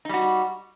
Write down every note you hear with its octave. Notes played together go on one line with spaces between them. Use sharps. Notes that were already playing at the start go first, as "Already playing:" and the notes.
G3 D#4 F#4